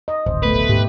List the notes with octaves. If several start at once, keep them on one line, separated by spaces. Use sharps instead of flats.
D#5
D1 G#1 C5
B2 A3 B4
G#2 G4